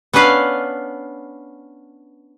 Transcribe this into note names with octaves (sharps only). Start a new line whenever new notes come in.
B3 C#4 D4 B4 F5